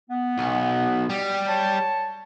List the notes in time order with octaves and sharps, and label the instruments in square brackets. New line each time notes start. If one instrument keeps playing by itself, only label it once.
[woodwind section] B3
[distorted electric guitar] B1
G3
[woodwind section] C#5 A5